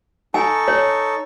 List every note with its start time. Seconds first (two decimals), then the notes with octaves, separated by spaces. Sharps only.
0.34 D#4 A4 G#5 C#6
0.68 C#5